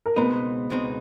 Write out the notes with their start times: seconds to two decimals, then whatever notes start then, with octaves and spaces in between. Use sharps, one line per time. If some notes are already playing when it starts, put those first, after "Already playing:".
0.06 A#4
0.16 C#2 B2 G#3 B3 C4 D#4 B4
0.70 C#2 B2 G#3 C4 D#4